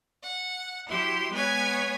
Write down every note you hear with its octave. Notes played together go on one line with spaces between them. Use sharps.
F#5
F#3 E4 G4 C6
G#3 B3 B4 C#5 G#5 G#6